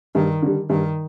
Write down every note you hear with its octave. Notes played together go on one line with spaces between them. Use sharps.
G2 D#3
D3 G3
G2 D#3